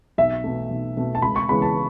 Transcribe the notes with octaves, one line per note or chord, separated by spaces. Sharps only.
B1 E5
B2 A3
B1
B2 A3
A5
C#2 B5
C#6
C#3 E3 G#3 B3 B5
A5